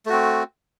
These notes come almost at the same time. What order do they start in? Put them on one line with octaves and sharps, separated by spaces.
A3 F#4 C4